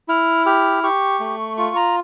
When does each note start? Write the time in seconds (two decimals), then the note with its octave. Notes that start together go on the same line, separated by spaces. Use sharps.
0.09 E4 F6
0.46 G4 F6
0.83 G4 C#6
1.20 A3
1.57 F4 C#6
1.76 A#5